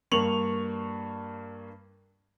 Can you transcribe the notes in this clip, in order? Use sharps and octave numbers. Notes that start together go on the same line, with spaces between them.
G2 A#3 C#6 F7 F#7